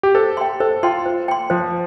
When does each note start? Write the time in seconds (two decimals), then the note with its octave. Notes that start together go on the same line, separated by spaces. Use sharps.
0.03 G4
0.15 A4 C5
0.37 G5 C6
0.60 A4 C5
0.83 F4 G5 C6
1.06 C5
1.28 G5 C6
1.50 F3 C5